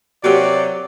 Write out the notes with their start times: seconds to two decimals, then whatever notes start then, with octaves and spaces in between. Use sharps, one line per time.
0.24 C3 F#3 F#4 G4 A#4 D5